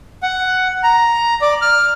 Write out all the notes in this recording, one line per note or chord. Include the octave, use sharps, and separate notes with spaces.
F#5
A#5
D5
F6